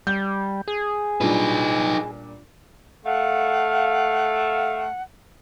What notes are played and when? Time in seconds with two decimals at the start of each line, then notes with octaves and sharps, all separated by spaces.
0.07 G3 G6
0.68 G#4
1.21 A#2 G3 D4 D#4 B4
3.05 A3 F5 F#5